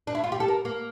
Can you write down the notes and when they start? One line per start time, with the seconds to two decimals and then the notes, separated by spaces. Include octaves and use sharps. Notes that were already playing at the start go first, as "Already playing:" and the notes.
0.07 D4
0.15 E4
0.24 F4
0.32 G4
0.40 A4
0.48 A#4
0.65 A#3